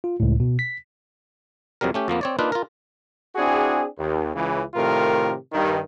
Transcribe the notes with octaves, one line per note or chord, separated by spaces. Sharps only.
F4
C#2 A2
B2
B6
F2 C3 F#3 G3 A#4
A3 C#4 G4
F2 F3 A#3 B3
C4 C#5 D5
A#3 D4 D#4 F4 B4
F4 A#4
C4 D4 E4 F#4 G#4
D#2
C#2 C#3 E3
A2 C3 D#3 A3 F4 A#4
G2 D#3